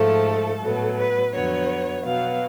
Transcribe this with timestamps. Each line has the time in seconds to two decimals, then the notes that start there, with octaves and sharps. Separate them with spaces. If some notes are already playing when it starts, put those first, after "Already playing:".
Already playing: G#2 F3 A3 A4
0.62 A2 F#3 B3
0.97 B4
1.33 F2 D3 F#3 B3 C#5
2.04 B2 F#3 B3 F5